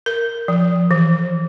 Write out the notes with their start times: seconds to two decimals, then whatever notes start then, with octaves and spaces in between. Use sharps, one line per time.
0.06 A#4
0.48 F3
0.91 E3